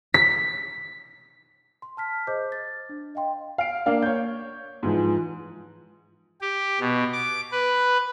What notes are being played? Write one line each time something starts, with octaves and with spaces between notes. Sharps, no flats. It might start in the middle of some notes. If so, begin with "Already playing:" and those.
B6
C6
A5 F6 B6
G#4 C5 D#5 D6 G6
A6
D4
D#5 F5 G5 C6
F5 D7
A#3 D4 F5
C#5 G6
G#2 E3 F3
G4
B2
D6
B4